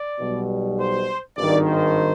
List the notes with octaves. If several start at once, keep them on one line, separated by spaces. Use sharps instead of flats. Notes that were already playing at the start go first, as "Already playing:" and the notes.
Already playing: D5
B1 B2 G3
C5
G#1 G2 D#3 D5
C5